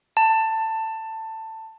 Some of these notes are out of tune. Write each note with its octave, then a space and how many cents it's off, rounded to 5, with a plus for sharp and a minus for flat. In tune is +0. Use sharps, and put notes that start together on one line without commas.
A5 +15